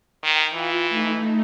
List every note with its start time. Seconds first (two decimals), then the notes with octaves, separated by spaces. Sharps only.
0.24 D#3 G5
0.53 E3 F4
0.89 A3 D#4